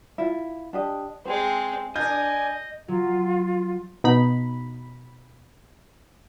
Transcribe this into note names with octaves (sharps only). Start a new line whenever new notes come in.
E4 F4
D4 G4 D#5
G#3 C4 C5
D4 A#4 D#5 G#5 G6
F#3 F4
B2 D#4 B5